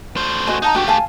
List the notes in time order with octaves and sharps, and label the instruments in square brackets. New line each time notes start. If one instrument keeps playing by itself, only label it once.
[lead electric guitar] A3 C5
[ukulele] F#4 D#5 G#5
[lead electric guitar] D#4 [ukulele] F#5 A5 A#5
[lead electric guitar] A3 G4 [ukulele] D4 F#4 G5
[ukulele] F5 G#5 A5